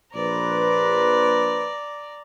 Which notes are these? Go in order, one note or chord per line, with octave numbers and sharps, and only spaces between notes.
A#1 B4 C5 D5 A#5